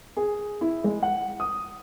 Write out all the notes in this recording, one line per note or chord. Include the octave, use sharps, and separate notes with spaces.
G#4
E4
G#3
F#5
D#6